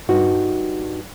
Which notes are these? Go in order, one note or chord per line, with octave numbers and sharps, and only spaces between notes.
G2 D#4 F#4